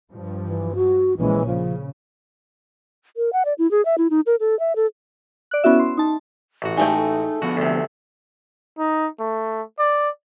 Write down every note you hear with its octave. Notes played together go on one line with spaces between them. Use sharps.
G2 F3
E3
F#4
A#1 E3 G#3 C#4
C#3 F3
A#4
F#5
D5
E4
G#4
E5
E4
D#4
A#4
A4
E5
A4
D5 F#6
B3 C#4 E4 F#4 E5
C6
D#4 A5
A1 F#4
G#3 A3 D#4 G4 G5
A4
D3 F3 B3 F#4
D2 C3
D#4
A3
D5